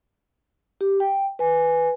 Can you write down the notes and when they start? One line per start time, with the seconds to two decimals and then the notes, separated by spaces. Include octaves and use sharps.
0.81 G4
1.00 G5
1.39 B4 G#5